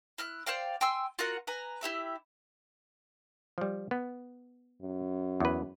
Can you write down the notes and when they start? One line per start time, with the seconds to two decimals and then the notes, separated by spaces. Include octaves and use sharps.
0.18 E4 F6 F#6
0.46 C5 D5 F5 G5
0.81 G5 G#5 C6 E6
1.19 F4 F#4 A#4 F#5
1.47 B4 G#5 A#5
1.81 E4 G4 E5 B5
3.58 F3 G3
3.91 B3
4.82 F#2
5.40 E2 B4